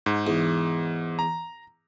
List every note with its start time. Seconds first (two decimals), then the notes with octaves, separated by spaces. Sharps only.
0.06 G#2
0.27 E2
1.19 A#5